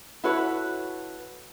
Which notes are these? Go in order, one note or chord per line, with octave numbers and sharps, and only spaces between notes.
E4 F#4 A4 B4 C#5